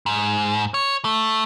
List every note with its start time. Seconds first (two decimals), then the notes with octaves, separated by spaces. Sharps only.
0.06 G#2
0.74 C#5
1.05 A3